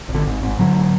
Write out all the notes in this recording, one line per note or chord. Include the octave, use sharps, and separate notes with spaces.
G#1
D3
G#2
G#2
G#2 D3 F#3